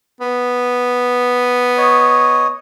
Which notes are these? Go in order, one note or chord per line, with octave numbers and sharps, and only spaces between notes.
B3
C#5 D#5